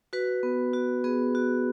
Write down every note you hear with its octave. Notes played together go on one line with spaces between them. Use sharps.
F#4 B4
B3
F#4
B3 G#4
F#4